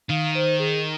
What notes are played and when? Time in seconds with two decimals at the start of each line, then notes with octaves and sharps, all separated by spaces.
0.10 D#3 F5
0.35 C5
0.59 G#4